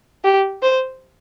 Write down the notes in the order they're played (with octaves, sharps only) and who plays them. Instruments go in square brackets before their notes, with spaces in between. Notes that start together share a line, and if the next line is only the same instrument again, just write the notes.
[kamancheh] G4
C5